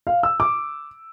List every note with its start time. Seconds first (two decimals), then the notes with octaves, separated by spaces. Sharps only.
0.07 F5
0.23 E6
0.40 D6